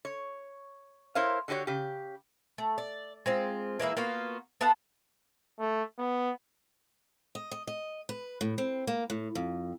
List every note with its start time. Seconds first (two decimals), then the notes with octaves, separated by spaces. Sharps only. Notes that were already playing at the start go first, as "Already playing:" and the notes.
0.05 C#5
1.15 E4 A#4 C5 C#5 F5
1.48 D3 F#4 G4 C5 C#5
1.67 C#3 G4
2.58 A3
2.78 D5
3.26 G#3 C4 F4
3.80 E3 G#3 A#3 E4
3.97 A#3 B3 F4 F#4
4.61 B3 A4 F5 F#5
5.59 A3
5.98 B3
7.35 D#5
7.51 D#5
7.67 D#5
8.09 B4
8.41 A2
8.58 C4
8.87 A#3
9.10 A2
9.35 F2